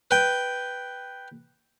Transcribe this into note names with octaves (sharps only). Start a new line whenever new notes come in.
B4 G5